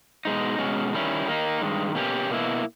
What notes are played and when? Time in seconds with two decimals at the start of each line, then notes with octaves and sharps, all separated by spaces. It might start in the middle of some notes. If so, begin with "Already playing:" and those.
0.25 B2 G#3 D#4
0.59 B2 G#3 C#4
0.93 D#3 G3 C#4 E4
1.27 D#3 A#3 D#4
1.61 G2 D#3 G#3
1.95 B2 A#3 C#4 G4
2.30 B2 A#3 E4